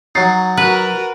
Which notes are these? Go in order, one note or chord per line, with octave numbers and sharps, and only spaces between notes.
F#3 D#4 C#5 A6 C7
F#4 A#4 B4